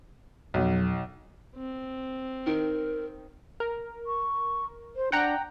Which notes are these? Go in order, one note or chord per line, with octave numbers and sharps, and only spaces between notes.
B1 F2 F#3
C4
D#3 A#4
A#4
C#6
C5
D4 F#5 G5 A#5